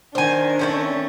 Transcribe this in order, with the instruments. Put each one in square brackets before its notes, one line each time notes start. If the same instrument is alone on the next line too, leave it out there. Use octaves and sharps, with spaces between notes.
[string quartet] D#3 D4 [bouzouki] C5 G#5
[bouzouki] A3 C4 C#4